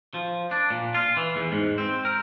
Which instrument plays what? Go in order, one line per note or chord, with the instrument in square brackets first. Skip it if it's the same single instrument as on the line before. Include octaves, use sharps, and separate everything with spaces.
[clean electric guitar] F3
D4
A#2
F4
E3
E2
G#2
C4
A#4